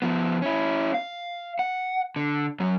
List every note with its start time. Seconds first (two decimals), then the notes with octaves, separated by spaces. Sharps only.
0.02 F3 B3
0.42 C#4 E4
0.94 F5
1.59 F#5
2.16 D3
2.60 F#2 F#3